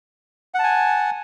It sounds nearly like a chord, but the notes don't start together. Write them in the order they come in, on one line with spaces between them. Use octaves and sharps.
F#5 A5 G#5